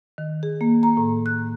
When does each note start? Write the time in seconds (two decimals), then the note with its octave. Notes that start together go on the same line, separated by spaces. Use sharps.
0.18 D#3
0.43 G#4
0.61 A#3
0.83 A#5
0.97 A2
1.26 F#6